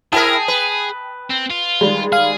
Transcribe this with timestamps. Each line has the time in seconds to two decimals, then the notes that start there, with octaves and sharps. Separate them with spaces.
0.12 E4 G#4 A#4 G5 A5 D#6
0.48 B4
1.30 C4
1.51 F4
1.81 D#3 G3 G#3
2.12 G#4 F5